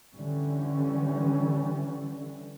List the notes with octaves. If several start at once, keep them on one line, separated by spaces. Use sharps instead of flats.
D3 E3 G3 C#4